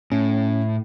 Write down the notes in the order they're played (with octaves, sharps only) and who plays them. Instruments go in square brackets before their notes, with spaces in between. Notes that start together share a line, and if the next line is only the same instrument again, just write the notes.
[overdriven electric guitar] A2 [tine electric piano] C#4